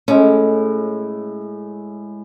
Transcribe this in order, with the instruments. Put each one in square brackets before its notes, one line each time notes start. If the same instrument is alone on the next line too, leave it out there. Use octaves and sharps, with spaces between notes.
[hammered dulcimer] A2 G#3 [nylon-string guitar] C#4